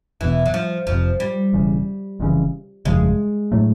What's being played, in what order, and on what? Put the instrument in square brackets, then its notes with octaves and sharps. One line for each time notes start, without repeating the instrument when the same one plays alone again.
[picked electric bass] E1 E2 B2 [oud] E3
[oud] F#3
F3
[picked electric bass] F1 F2 C3 [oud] F3
[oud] G3
[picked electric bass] E1 E2 C#3
F1 F2 C#3 E3
[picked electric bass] G1 F2 C#3 F3 [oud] G#3
[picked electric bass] A2 F#3 A3